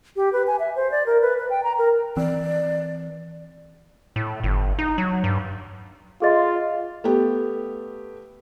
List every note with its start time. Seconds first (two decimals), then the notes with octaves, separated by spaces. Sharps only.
0.16 G4
0.33 B4
0.47 G#5
0.59 E5
0.76 C5
0.91 D5
1.06 A#4
1.22 B4
1.38 B4
1.50 G5
1.63 A#5
1.78 A#4
2.17 E3 C4 D5
4.16 A2
4.44 G1
4.79 D#4
4.98 F#3
5.24 G2
6.22 F4 G#4 D#5 C6
7.04 A3 B3 G4